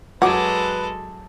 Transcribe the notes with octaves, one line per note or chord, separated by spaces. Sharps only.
F#2 F#3 G#3 A4 B4 F#5 D6